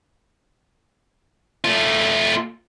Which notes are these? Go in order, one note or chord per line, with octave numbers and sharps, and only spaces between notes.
A3 F4